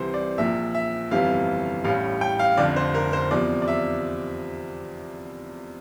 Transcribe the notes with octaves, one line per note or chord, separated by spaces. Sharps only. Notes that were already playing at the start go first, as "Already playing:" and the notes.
Already playing: C2 C3 E3 C5
D5
A#1 A#2 F3 E5
E5
G1 F2 C3 E3 G3 F5
A1 A2 G3 F5
G5
F5
F1 F2 D3 D5
C5
A#4
C5
E2 C3 F3 D5
D5
E5